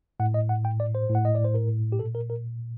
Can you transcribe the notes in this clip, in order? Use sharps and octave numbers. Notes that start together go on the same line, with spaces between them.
A2 F#5
D#5
F#5
G5
D5
C5
A2
F#5
D#5
D5
C5
A#4
G4
A#2 A4
A#4
A#4